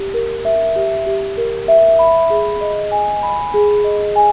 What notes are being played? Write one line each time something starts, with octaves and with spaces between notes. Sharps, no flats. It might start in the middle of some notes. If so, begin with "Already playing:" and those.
Already playing: G4
A#4
E5
G4
G4
A#4
E5
B5
G#4
D#5
G#5
B5
G#4
D#5
G#5